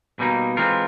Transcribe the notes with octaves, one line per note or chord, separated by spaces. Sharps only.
B2 G3 A#3 D#4
E3 G#3 C4 F4 A#4